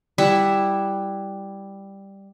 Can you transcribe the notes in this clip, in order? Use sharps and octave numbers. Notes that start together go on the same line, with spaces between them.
G3 E4 E5 F#5